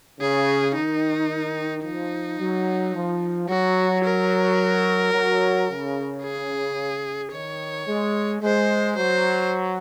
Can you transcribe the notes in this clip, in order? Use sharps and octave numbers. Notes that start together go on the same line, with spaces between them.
C#3 G#4
D#3 D#4
F3 D#4
F#3
F3
F#3 F#4
A#4
F#3
C#3
G#4
D#3 C#5
G#3
G#3 C5
F#3 C5